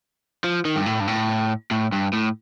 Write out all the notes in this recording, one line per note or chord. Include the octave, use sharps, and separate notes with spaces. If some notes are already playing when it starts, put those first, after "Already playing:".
F3
D#3
G2
A2
G2
A2
A2
G2
A2